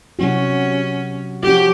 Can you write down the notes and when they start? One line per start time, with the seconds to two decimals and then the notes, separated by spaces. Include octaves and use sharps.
0.19 C3 F#3 C#4 F#4
1.43 F3 F#3 C#4 F#4 G4